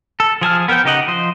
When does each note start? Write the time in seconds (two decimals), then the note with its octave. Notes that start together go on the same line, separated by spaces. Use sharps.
0.20 A4
0.41 F3 G#4 A5 F6
0.68 B3 A#4 C5 G5 G6
0.84 C#3 D#4 G4 D#5 F#5
1.08 F3 C5 D#5